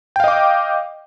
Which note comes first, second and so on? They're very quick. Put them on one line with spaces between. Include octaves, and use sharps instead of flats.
G5 F5 D#5 D6